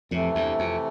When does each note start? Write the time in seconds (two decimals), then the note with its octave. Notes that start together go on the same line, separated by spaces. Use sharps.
0.11 F2 A2 C3 E3 A3
0.35 E2 G2
0.59 F2